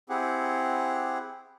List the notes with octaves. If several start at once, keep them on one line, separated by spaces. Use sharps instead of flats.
C4 E4 G4 G#4 F#5